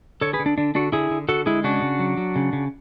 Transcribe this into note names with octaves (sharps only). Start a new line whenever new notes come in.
D3 A4 C#5
G#4 B4
D3
D4
D3 D4
D3 D4 F#4
D3 E4 G#4
D3
D3 F#4 A4
G#3 E4 G#4
C#3 D4 F#4
C#3
F#3
F#3
C#3
C#3